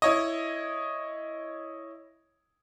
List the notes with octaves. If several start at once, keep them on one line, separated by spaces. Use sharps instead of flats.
E4 C#5 D#5